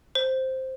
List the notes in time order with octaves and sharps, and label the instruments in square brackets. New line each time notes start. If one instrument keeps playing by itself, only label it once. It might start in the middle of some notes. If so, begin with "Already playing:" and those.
[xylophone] C5